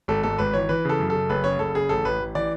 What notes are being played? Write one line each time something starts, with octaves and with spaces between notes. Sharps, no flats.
G#1 A4
G#2 A4
G#1 B4
E3 C#5
E3 B4
C#3 A4
F#2
A4
C#3
F#1 B4
C#3 C#5
F#1 A4
C#3 G#4
A1 A4
A1 B4
A1
E3 D5